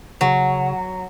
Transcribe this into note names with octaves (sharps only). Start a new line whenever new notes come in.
C#3 F#3